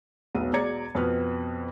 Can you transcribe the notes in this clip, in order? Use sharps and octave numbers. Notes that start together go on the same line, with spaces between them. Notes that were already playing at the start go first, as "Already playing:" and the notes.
E1 B1 B3 D#7
E2 B2 D5 A#5 G#6 C#7
F2 B2 B4 D#6 F6